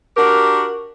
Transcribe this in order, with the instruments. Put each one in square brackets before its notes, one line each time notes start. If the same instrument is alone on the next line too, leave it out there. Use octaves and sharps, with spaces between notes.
[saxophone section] D4 F#4 G4 A#4